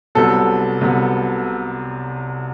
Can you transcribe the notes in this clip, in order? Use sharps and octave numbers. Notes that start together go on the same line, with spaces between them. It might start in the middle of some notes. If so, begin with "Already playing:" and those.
C2 C3 F#3 B3 A4
C2 C3 F#3 B3